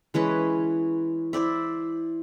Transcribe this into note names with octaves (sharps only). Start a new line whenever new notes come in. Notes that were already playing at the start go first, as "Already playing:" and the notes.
E3 G#3 C#4 B4
E4 C5 D5 E5